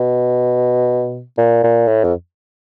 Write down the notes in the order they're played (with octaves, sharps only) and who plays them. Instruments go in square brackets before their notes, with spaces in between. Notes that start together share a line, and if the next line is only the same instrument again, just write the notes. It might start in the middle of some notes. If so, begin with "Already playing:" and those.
Already playing: [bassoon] B2
A#2
A#2
A2
F2